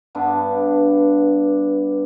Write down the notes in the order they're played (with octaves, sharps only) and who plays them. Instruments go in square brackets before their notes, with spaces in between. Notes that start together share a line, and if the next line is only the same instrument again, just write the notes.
[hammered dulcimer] G2 B3 D4